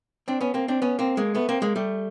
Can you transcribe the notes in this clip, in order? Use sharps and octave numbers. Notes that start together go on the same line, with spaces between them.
C4 D4
B3 C#4
A#3 C4
C4 D4
B3 C#4
A#3 C4
G#3 A#3
A3 B3
A#3 C4
G#3 A#3
G3 A3